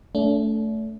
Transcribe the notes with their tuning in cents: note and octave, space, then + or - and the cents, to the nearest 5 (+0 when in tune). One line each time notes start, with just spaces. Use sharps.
A3 +0 D4 -45